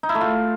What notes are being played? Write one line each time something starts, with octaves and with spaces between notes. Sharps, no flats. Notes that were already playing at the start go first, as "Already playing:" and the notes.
D#4
E4
A3
F4